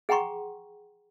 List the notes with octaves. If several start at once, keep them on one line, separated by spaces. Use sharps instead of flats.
G#4 F#5 G5 A#5 C6 C#6